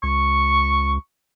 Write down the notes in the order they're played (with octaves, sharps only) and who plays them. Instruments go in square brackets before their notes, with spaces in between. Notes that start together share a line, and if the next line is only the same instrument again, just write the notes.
[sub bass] C#2 [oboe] C#6